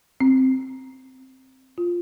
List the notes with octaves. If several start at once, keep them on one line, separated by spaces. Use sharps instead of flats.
C4
F4